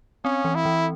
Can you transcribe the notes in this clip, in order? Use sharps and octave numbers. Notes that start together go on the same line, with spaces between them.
C4 C#4
E3
E4
E3